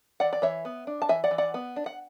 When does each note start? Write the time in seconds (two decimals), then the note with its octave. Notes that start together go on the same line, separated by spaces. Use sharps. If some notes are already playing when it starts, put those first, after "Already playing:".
0.20 E3 D5 F#5
0.33 D5
0.42 E3 C#5 E5
0.65 B3
0.87 D4
1.02 A5
1.09 E3 E5 G#5
1.24 D5 F#5
1.31 E3
1.38 D5 F#5
1.54 B3
1.76 D4
1.86 F#5